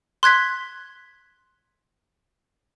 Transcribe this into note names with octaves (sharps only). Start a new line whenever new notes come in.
C6 F#6 G#6 B6